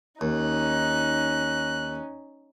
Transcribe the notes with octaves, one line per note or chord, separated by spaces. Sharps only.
D#2 C#4 D#4 F#6